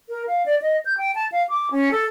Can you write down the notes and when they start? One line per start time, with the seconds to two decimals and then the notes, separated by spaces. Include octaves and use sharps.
0.09 A#4
0.27 F5
0.46 D5
0.62 D#5
0.86 G6
0.98 G5
1.15 A5
1.32 F5
1.49 D6
1.71 C#4
1.91 A4